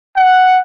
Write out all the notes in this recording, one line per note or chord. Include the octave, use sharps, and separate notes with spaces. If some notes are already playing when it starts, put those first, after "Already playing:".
F#5